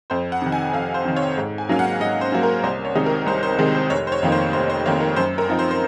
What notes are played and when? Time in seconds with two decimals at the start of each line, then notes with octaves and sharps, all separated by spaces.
0.10 F2 C5
0.32 F#5
0.42 C3 D#3
0.52 G#5
0.73 F2 F5
0.94 C5
1.05 C3 D#3
1.16 C#5
1.38 G#2
1.58 G#5
1.69 F#3 A#3 C#4 F5
1.79 F#5
2.00 G#2 D#5
2.21 C5
2.32 F#3 A#3 C#4
2.43 A#4
2.63 C2 C5
2.85 C#5
2.95 C3 D#3 G#3 D#4
3.06 A#4
3.26 C2 C5
3.43 C5
3.59 C3 D#3 G#3 D#4 A#4
3.74 C5
3.90 F1 C#5
4.07 C5
4.12 C#5
4.23 F2 D#3 A#3
4.32 C5
4.53 F1 C5
4.70 C5
4.86 F2 D#3 A#3 C#5
5.01 A#4
5.16 F#2 C5
5.38 A#4
5.49 F3 C4 D#4
5.59 C5
5.71 C5